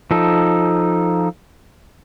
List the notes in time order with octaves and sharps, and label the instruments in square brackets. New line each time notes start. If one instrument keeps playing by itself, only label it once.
[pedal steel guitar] F3 D#4 A4